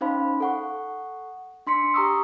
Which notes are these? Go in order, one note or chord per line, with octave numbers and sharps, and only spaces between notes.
C#4 D#4 C5 F5 B5
A4 F#5 C#6
D4 C6 B6 C#7
G4 A#5 C#6 D#6 E6